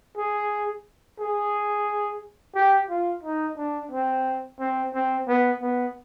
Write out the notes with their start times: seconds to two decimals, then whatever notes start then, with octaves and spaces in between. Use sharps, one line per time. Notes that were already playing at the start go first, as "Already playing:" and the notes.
0.17 G#4
1.20 G#4
2.55 G4
2.90 F4
3.23 D#4
3.57 D4
3.91 C4
4.60 C4
4.94 C4
5.27 B3
5.62 B3